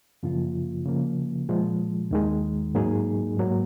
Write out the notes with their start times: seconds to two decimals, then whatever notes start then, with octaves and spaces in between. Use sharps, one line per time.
0.23 F#2 C#3 F3 A#3 F4
0.86 C#3 F3 A#3
1.49 A#2 F3 G#3
2.11 D#2 D#3 G#3
2.75 G#2 F#3 A#3 D#4 G#4
3.37 G#2 F#3 A#3